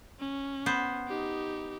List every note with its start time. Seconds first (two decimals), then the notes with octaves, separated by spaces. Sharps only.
0.20 C#4
0.66 B3 C5
1.08 D#4 G4